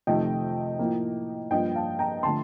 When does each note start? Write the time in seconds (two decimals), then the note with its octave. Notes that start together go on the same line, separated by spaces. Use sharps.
0.07 F2 C3 D#3 A3 D#5 G5
0.79 A2 F3 A#3
1.51 G2 F3 A#3 D#5 G5
1.75 F5 A5
1.99 G5 A#5
2.23 D3 F3 A3 A5 C6